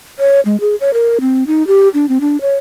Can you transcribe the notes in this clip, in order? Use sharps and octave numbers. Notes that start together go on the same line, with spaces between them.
C#5
G#3
G#4
C#5
A#4
C4
D#4
G4
D4
C4
D4
C#5